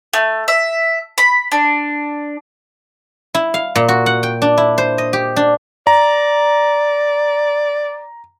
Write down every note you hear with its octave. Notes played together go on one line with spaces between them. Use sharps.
A3
E5
B5
D4
E4
F5
A#2
F#4
F#5
G5
D4
E4
C5
D#5
G4
D4
D5 A#5